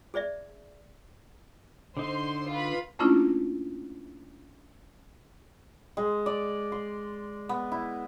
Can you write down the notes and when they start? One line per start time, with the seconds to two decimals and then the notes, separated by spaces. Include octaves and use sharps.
0.14 G#4 C5 D5 E5
1.97 D3 D#4 C5 C6 C7
2.50 F4 B4 B5
2.99 A3 A#3 C#4 D4 E4 F4
5.97 G#3
6.26 D5
6.72 C6
7.49 B3
7.72 E4